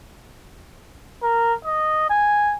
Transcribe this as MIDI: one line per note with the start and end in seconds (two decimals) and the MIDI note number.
1.23 1.53 70
1.65 2.07 75
2.10 2.57 80